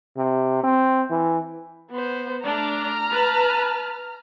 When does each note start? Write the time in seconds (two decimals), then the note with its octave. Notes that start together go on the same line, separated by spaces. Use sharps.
0.17 C3
0.64 C4
1.10 E3
1.91 B3 C5
2.45 A3 D4 A#5 F6
3.10 B4 A5